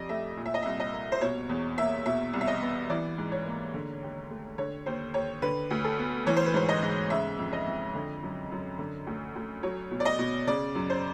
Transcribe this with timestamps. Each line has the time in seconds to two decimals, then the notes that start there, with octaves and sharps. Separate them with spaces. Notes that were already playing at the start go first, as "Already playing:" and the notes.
Already playing: F2 C3 D5 D#5
0.09 A3 E5
0.37 A#2
0.46 E5
0.54 D#5
0.63 C2 E5
0.80 D#5
0.93 A#3
1.12 C5
1.21 B2 C#5
1.49 E2
1.78 A#3 E5
2.06 B2 E5
2.33 C2
2.41 E5
2.47 D#5
2.62 B3
2.90 E3 D5
3.18 G#2
3.32 C#5
3.46 A#3
3.74 D3
4.03 D#2
4.30 A3
4.58 D3 C#5
4.86 D#2 C5
5.14 D#2 C#5
5.42 D3 B4
5.70 D2
5.84 A4
5.99 B3
6.27 E3 C#5
6.37 C5
6.46 B4
6.54 G#2 C5
6.69 D#5
6.83 G#2
7.10 C#3 E5
7.38 F2
7.53 D#5
7.66 F2
7.95 D3
8.23 F#2
8.51 F#2
8.79 D3
9.07 D2
9.35 D2
9.63 F#3 C#5
9.91 B2
10.00 D5
10.05 D#5
10.19 B2
10.47 C#3 D5
10.75 F#2
10.90 C5